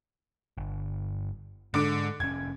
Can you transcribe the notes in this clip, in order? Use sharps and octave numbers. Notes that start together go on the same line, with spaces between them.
G1
G#2 D3 D6 D7
F1 C#4 G#6